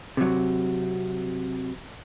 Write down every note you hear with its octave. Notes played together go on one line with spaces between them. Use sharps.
C3 F#3